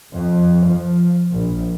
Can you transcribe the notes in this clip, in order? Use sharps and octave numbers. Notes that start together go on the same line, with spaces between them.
F2
F3
A#1